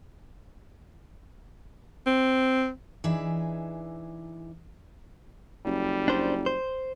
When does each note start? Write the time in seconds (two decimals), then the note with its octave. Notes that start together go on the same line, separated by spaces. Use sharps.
2.07 C4
3.04 E3 D4 D#4 G#4 E5
5.65 F#1 G3
6.08 D4 C5
6.46 C5